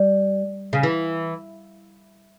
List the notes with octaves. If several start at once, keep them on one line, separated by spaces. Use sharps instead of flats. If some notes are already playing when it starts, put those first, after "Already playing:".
Already playing: G3
C#3
E3